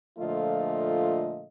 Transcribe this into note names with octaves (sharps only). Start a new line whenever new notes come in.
A#2 D3 F3 A3 F4 D#5